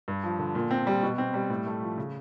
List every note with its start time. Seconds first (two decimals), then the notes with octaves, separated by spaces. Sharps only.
0.08 G2
0.24 F3
0.39 D3
0.55 A#2
0.71 C4
0.87 G3
1.03 B2
1.18 C4
1.34 G3
1.50 A2
1.66 A3
1.82 F3
1.98 C#3